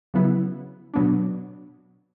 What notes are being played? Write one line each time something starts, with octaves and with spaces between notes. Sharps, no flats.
C#3 F#3 B3 E4
B2 F#3 B3 D4